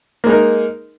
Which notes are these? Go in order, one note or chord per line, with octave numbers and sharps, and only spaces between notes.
G#3 A#3 D#4 A#4